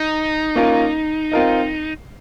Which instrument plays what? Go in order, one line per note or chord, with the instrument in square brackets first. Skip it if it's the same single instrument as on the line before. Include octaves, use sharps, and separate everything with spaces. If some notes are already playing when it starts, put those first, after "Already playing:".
Already playing: [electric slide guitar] D#4
[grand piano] A#3 C#4 F4 A#4
C4 F4 A#4 D#5